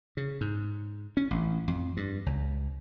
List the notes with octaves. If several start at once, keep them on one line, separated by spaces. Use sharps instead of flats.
C#3
G#2
C#4
A1
F2
G2
C#2